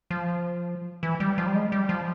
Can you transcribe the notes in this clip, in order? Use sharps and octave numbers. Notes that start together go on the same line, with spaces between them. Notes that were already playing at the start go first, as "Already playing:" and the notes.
F3
E3
G3
F3
G3
G#3
G3
F3